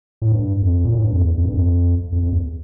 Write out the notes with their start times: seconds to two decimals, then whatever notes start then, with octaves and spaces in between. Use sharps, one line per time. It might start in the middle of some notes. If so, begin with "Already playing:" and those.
0.22 A2
0.32 G2
0.62 F2
0.84 A#2
0.94 A2
1.03 G2
1.13 F2
1.22 E2
1.38 F2
1.45 G2
1.54 F2
2.12 F2
2.23 F2
2.33 E2